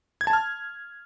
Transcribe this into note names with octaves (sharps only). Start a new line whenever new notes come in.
G#6
A5
F6